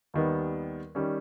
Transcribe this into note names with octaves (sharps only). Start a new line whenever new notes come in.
D#2 D#3 G3 B3
D#3 G3 C#4